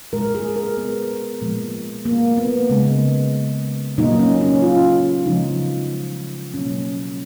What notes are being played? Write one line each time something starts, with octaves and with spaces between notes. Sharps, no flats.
A#2 G#3 A#4
G#4
A#4
B3
A#2 F3 G#3
A#3
B3
C#3 G#3
A#2 F#3 A#3 D#4
C#4
C#4
F4
C#3 F3 G#3 D#4
B2 F#3 A#3 C#4